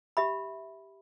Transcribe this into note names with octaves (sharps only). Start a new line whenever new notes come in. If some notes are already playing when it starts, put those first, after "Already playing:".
G4 E5 B5